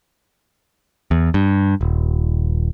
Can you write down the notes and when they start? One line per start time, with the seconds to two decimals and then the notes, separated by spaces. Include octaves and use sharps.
1.11 E2
1.34 G2
1.81 D#1